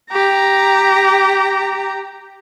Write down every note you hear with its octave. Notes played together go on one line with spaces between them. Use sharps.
G4 A#5